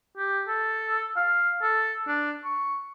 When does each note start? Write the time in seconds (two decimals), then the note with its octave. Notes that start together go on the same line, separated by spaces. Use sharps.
0.18 G4
0.48 A4
1.16 F5
1.62 A4
2.07 D4
2.45 C#6